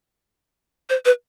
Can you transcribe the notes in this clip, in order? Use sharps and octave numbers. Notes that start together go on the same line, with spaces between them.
C5
B4